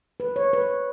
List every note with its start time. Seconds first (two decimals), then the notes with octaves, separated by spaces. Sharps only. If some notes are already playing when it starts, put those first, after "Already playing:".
0.20 B4
0.36 C#5
0.53 B4